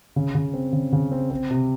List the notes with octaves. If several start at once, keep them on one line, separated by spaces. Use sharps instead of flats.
C#3
C#3
C4
C#3
C#3
C4
C4
C3